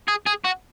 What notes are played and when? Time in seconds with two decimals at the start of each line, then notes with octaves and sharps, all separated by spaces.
0.08 G#4
0.26 G#4
0.45 F#4